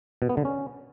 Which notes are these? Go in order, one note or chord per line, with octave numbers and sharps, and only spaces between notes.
B2
B3
D3
C#4